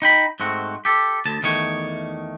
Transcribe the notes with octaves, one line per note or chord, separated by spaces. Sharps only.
D#4 G5 B5
G#2 A3 C4 F#4
G4 A4
D2 A5
E2 D#3 A3 C#5